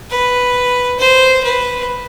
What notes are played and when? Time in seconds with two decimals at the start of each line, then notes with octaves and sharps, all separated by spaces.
0.10 B4
0.99 C5
1.44 B4